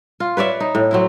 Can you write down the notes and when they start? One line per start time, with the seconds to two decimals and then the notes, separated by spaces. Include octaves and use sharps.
0.20 F4
0.37 B4 C#5 D5 E5
0.60 D#4
0.75 A2
0.91 F#3 C4 E4